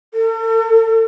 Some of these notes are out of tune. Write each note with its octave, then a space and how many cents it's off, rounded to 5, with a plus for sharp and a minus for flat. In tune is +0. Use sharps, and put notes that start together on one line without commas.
A4 +40